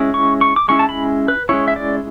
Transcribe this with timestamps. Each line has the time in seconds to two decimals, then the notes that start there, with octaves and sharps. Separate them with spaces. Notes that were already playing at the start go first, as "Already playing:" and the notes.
Already playing: G#3 C#4 E4
0.14 C#6
0.41 C#6
0.56 D6
0.68 G#3 C#4 E4 C#6
0.79 A5
0.89 B5
1.28 B4
1.49 G#3 C#4 E4 C#5
1.68 E5
1.76 D5